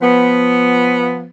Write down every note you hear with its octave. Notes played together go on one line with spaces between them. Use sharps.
F3 B3